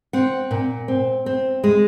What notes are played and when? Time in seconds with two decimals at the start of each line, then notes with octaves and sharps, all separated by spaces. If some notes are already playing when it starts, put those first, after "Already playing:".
0.13 C4 F#5
0.51 A#2
0.88 C4
1.26 C4
1.64 G#3